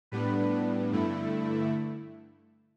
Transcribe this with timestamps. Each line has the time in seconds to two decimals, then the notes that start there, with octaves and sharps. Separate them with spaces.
0.12 A2 G3 B3 D4 B4
0.92 G2 D3 A3 E4